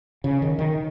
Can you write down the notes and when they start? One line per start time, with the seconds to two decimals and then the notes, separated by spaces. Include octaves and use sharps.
0.24 C#3
0.42 D#3
0.59 D#3